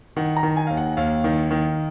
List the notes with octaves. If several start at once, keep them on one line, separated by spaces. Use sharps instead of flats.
D#3 F#5
A#5
D#3
G#5
D#2 F5
F#5
D#2 F5
D#3
D#3